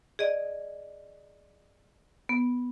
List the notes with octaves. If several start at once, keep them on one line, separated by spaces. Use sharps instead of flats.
G#4 D5 D#5
B3